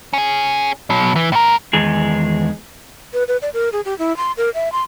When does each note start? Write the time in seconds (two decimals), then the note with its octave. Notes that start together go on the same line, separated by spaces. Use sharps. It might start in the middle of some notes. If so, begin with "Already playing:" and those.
0.13 C#4 G#4
0.90 B2 F#3
1.16 E3
1.32 A2 A#4
1.73 E2 D#3 G#3 G#4
3.14 B4
3.28 B4
3.42 D5
3.54 A#4
3.72 G#4
3.85 G4
3.99 E4
4.17 C6
4.37 A#4
4.54 E5
4.72 C6